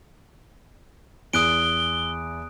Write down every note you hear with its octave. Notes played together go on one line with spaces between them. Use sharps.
E2 D#6 F#6 D7 G7